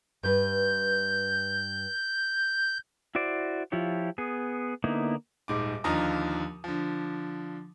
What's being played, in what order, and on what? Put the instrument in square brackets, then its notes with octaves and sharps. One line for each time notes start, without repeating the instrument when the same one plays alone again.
[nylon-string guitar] G2 B4 [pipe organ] G6
[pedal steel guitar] E4 F#4 C5 D5
F3 E4 F4 G4 C#5
B3 G#4
D3 A#3 B3 D#4 E4
[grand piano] D#1 G#2 D6
D#2 D3 F3 D#4 A#5 D#6
D3 F3